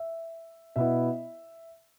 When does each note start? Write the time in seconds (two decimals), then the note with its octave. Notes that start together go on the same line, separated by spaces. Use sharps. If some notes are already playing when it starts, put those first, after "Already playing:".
Already playing: E5
0.76 B2 B3 E4 E5